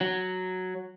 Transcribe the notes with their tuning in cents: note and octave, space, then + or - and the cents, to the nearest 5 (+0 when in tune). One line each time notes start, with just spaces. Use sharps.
F#3 +0